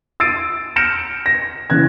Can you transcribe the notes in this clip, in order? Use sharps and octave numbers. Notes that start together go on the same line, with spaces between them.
E6 A6 C7 D7 D#7
F6 G6 A#6 C#7 D7 E7
A#6
C#3 E3 F#6 G#6